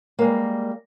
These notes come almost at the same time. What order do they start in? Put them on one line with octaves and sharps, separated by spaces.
A#3 G#3 G3